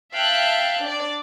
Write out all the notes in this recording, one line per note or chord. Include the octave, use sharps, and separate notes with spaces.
E5 F5 G5 A5 F#6
D4 D5